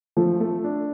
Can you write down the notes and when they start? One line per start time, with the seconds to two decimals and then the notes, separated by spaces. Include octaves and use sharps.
0.17 F3 A3
0.40 A3
0.64 D4